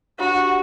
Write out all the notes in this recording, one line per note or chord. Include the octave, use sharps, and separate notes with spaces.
D4 F#4 G4 C#5 F#5